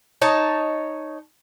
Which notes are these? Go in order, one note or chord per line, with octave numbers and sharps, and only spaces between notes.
D#4 C#5 A5